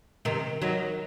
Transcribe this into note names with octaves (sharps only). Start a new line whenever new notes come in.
C3 D#3
D#3 F#3